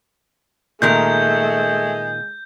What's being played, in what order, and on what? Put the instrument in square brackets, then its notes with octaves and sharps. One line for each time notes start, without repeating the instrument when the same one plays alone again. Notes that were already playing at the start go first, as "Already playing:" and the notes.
[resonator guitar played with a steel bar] A#2 D#3 A#4 [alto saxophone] G#3 [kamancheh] A3 [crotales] G6